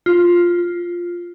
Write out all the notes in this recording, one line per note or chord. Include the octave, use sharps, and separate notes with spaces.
F4